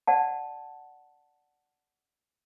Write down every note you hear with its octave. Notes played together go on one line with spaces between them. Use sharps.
D5 F#5 A5